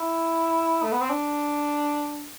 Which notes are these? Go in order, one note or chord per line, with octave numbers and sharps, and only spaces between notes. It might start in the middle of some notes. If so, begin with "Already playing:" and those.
Already playing: E4
A3
B3
C4
D4